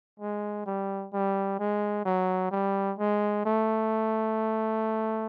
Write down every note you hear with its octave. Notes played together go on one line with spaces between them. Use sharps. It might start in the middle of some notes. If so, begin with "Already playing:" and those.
G#3
G3
G3
G#3
F#3
G3
G#3
A3